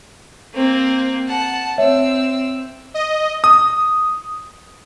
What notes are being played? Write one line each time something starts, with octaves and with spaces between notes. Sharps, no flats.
A#3 C4
F#5 A5
C4 C#5 E5 E6
D#5
D#6